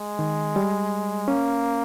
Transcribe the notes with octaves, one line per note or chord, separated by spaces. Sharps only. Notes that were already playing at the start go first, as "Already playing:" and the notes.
Already playing: G#3
D#3
G3
A#3 C#4